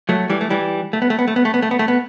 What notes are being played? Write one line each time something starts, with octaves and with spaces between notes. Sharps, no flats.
F#3 A3
E3 G3
A3
E3 G3
A3
B3
A3
B3
A3
B3
A3
B3
A3
B3
A3
B3